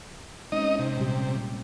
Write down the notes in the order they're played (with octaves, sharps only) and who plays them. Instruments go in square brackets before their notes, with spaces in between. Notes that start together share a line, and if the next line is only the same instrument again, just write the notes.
[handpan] G#3 C4 C#4 [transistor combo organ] D#4 D#5
[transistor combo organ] C3
[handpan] A#2 G3 G4